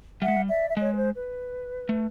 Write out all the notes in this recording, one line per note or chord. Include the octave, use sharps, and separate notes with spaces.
G3 E5 F#5
G#3
G3
D5 E5
E5
G#3 C#5 D#5
B4
C5
B4
A3